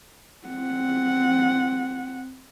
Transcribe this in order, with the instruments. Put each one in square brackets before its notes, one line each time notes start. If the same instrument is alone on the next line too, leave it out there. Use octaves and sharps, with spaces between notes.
[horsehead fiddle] C4 F#5